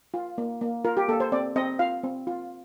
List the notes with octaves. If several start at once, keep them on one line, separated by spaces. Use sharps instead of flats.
F4
A#3
A#3
F4 A#4
G4
A#3 A4
C5
C4 D5
C4 D#5
F4 F5
C4
F4